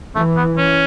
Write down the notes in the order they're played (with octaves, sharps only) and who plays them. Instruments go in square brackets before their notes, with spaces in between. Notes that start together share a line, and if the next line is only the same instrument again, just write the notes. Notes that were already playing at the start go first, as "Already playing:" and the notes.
[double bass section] E3 [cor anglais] A3
[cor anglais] B3
C#4